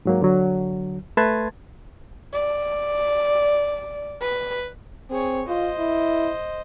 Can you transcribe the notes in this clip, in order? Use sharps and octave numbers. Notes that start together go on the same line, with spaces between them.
G#2 F#3 A#3
D3 F#3
A3 B4 A5 C6 G#6 A6
D5
B4
C4 G#4 C#5
F4 C5 D#5
E4